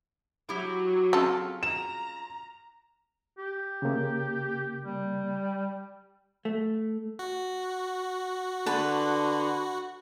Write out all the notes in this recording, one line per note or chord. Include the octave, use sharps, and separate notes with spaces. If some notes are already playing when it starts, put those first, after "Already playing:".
F#3 E4 F#4 G4
C#3 C4 C#4 F4 A4
A#5 E7
G4
C#3 A#3
G3
A3
F#4
D3 B4 A5